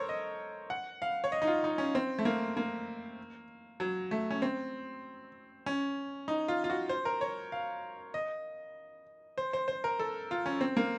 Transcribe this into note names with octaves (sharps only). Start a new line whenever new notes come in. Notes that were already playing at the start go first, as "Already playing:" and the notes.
Already playing: A4 A#4 C5 C#5
D#5
F#5
F5
C#5
D#5
D#4
F4
D#4
C#4
C4
A3
A#3
A#3
F#3
A3
C#4
C4
C#4
D#4
F4
F4
F#4
C5
A#4
C#5
F5
D#5
C5
C5
C5
A#4
A4
F4
C#4
C4
A#3